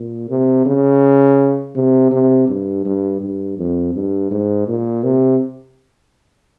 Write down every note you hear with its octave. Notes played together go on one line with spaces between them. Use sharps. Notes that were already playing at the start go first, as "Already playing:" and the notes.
Already playing: A#2
C3
C#3
C3
C3
G2
G2
G2
F2
G2
G#2
A#2
C3